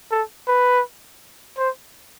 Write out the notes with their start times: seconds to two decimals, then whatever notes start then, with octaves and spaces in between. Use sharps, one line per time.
0.11 A4
0.48 B4
1.58 C5